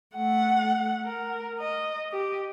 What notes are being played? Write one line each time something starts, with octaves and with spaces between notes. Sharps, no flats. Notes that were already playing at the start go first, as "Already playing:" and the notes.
A3 F#5
A#4
D#5
G4